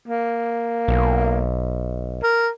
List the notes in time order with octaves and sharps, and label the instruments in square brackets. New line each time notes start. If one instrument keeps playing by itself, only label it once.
[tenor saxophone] A#3
[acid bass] B1
[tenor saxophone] A#4